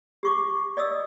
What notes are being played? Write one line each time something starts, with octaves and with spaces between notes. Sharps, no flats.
G4 C#6 D6
D5 D#5 D#6 E6